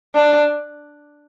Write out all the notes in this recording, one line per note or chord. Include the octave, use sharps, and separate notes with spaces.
D4